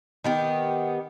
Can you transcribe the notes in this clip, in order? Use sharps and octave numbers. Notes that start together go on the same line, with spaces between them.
D#3 B3 G4